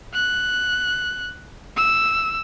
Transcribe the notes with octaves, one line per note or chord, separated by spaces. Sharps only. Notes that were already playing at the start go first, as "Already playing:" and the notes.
F#6
E6